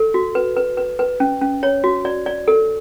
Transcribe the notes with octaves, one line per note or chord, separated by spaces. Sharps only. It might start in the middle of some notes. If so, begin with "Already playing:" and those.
Already playing: A4
F#4
B4
B4
B4
B4
C#4
C#4
C#5
F#4
D5
D5
A4